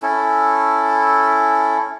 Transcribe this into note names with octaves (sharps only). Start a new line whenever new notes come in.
C#4 E4 A4